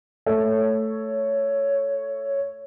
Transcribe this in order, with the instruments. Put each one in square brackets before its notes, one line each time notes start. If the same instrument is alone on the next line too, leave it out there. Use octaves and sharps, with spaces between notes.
[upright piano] A3 [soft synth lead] C#5